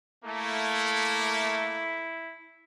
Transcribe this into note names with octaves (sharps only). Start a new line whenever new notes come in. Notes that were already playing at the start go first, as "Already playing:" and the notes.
A3 A#3 E4